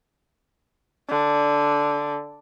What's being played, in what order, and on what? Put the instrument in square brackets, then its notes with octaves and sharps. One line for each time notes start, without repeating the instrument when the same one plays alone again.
[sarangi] D3